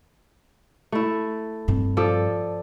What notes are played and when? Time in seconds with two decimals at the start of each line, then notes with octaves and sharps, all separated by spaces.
0.92 A3 E4
1.68 G2 C4
1.97 F3 A4 D5